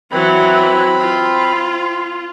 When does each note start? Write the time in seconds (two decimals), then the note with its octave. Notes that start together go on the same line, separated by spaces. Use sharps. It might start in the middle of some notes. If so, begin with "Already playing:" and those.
0.11 E3 F#3 C4 B5
0.99 F4